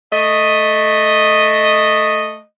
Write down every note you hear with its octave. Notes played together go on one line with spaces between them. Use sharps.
A3 D#5